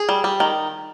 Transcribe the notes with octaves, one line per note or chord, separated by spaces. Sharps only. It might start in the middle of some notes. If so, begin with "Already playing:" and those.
Already playing: G#4
G3
G3
D#3